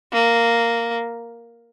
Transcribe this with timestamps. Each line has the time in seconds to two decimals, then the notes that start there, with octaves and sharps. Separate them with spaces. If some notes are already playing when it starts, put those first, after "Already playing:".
0.13 A#3